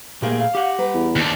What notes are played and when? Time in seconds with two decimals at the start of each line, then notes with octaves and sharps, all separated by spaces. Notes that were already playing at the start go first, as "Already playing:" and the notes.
0.22 A#2 A3 A#3 D#4 G4 G#4
0.40 F5
0.55 G4 F#5
0.78 G3 B4 A#5
0.94 E2
1.16 D#2 D4